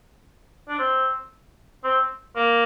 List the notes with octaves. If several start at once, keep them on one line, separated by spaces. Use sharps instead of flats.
D4
C4
C4
A#3